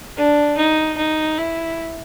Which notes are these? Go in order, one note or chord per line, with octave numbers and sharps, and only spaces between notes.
D4
D#4
D#4
E4